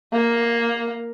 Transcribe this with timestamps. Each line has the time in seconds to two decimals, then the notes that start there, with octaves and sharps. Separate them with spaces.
0.13 A#3